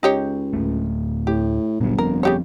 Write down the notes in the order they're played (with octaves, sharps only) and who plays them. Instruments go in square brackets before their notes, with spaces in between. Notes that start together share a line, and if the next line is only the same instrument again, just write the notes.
[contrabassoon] C#2 [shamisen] D#4 G4 C#5
[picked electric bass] D1 D#2 A3
[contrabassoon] A2 [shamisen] G4
[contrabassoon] G1 [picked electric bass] A#2 F#3
[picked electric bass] F3 C4 [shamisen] A#4
[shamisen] C#3 G4 C#5